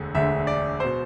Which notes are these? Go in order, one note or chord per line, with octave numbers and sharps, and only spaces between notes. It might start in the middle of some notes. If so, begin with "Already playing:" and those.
Already playing: E1 D2 D3
E1 D2 D3 E5
D5
B2 C5